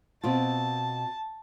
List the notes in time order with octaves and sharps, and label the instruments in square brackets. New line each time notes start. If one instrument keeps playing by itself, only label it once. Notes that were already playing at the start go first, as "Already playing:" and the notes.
[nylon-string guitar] B2 C4 F4 [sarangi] A5